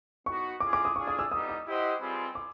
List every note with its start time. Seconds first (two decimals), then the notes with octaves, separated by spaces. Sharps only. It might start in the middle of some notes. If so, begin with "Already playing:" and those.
0.26 B3 D#4 F#4 C#6
0.60 G#3 C#4 F4 G#4 D6
0.73 D6
0.85 D#6
0.96 D4 F4 G#4 C#6
1.08 D#6
1.19 E6
1.31 G3 B3 D#4 D#6
1.49 D#6
1.66 E4 G4 C5 D#5 F#5
2.00 G3 C4 F4 G#4 B4
2.35 D6